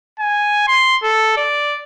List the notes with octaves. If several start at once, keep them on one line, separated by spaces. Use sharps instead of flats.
G#5
C6
A4
D5